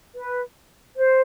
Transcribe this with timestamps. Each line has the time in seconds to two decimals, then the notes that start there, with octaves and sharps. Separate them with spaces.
0.16 B4
0.97 C5